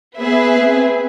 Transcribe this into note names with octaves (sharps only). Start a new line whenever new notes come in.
B3 G#4 B4 E5
C4